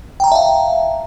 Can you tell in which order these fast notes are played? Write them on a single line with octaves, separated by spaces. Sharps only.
G5 A#5 A5 E5 F5